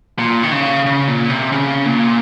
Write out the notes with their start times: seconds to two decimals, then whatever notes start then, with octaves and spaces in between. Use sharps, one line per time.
0.19 A#2
0.43 D#3
0.52 C#3
0.86 C#3
1.08 A#2
1.30 C3
1.52 C#3
1.86 A#2